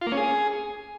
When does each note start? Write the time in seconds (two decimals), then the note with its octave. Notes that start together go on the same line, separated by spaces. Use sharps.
0.01 F4
0.07 A#3
0.12 C#4
0.17 G#4